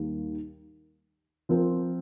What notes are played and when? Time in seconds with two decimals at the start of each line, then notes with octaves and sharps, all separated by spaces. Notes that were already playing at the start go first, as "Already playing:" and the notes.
Already playing: D#2 D#3 G3 A#3
1.49 F3 C4 F4 A#4